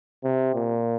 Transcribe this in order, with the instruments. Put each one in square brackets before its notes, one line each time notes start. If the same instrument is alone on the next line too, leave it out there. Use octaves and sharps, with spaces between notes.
[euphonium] C3
A#2